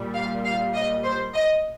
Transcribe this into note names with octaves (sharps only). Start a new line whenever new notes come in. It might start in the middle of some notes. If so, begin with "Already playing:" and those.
Already playing: A#2 G3
F5
F5
D#5
C5
D#5